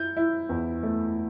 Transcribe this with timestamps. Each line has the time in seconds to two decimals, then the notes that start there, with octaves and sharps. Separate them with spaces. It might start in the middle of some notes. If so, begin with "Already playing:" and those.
Already playing: E4 G6
0.17 E4
0.49 E2
0.83 A3